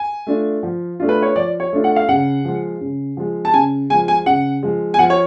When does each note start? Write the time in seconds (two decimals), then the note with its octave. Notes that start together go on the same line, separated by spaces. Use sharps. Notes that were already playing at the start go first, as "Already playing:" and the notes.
Already playing: G#5
0.27 A3 D4 F4
0.63 F3
1.00 A3 D4 F4
1.09 B4
1.22 C#5
1.36 F3 D5
1.60 C#5
1.72 A3 D4 F4
1.84 F#5
1.96 F5
2.08 C#3 F#5
2.45 F3 G#3
2.81 C#3
3.17 F3 G#3
3.45 A5
3.54 C#3 G#5
3.90 G#3 G#5
3.94 F3
4.08 G#5
4.26 C#3 F#5
4.63 F3 G#3
4.94 G#5
4.99 F3 F#5
5.10 C#5